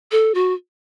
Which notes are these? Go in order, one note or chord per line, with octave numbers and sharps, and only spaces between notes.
A4
F#4